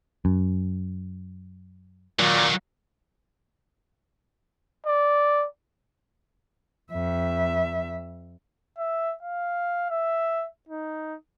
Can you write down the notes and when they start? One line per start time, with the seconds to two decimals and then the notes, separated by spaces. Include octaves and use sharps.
0.25 F#2
2.19 A#2 D#3 F#3
4.86 D5
6.92 F2 E5
8.78 E5
9.23 F5
9.90 E5
10.68 D#4